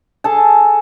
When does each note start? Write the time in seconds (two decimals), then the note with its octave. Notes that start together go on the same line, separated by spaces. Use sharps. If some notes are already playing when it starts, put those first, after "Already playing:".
0.24 G#4 A4 A5